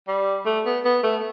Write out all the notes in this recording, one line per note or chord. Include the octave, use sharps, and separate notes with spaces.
G3
A3
B3
B3
A3